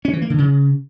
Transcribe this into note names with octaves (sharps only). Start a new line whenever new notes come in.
C#4
E3
A#3
D3
C#3